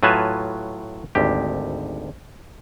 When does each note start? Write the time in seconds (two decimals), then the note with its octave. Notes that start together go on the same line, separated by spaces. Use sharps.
0.03 A2 F#3 F4 B4 G#5 A5
1.15 G#1 D2 G4